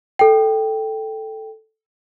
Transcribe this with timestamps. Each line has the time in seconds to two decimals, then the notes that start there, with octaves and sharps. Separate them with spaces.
0.19 A4 G5